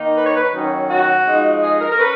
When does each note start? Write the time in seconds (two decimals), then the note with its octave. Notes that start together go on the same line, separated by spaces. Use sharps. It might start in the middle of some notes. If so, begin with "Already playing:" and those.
Already playing: D#3 A#3 D#4
0.16 B4
0.26 C#5
0.36 B4
0.53 D#3 F#3 C#4 D#4
0.89 F#4
1.27 F3 G#3 D#4
1.63 G#4
1.81 A#4
1.91 A#4
1.99 C#4 B4